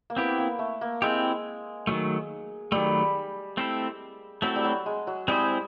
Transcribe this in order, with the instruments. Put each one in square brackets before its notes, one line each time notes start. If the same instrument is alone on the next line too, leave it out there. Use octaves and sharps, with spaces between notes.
[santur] A#3
[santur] B3 [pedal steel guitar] C4 E4 G4
[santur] A#3
A3
A#3
[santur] G#3 [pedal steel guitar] C4 E4 G4
[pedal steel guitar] D#3 F#3 A3
[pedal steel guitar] D#3 F#3 A3 [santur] G3
[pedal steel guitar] A3 C4 E4 A4
[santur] F#3 [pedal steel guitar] A3 C4 E4 A4
[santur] G3
F#3
G#3
F#3
[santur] G3 [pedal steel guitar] G#3 C4 E4 G#4 C5